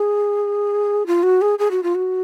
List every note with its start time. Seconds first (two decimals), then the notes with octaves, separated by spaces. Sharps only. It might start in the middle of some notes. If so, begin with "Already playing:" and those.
Already playing: G#4
1.07 F4
1.23 F#4
1.42 G#4
1.59 G#4
1.71 F#4
1.83 F4
1.95 F#4